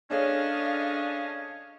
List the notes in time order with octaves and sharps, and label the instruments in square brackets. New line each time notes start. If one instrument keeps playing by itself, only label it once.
[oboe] C#4 [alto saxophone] D4 [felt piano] G#4 A4 C#5 [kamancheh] D#5 F5